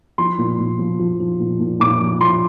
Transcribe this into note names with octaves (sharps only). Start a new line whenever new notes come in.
F3 C6
A#2
A#2
F3
F3
F3
A#2
A#2
A#2 D6
F3
F3 C6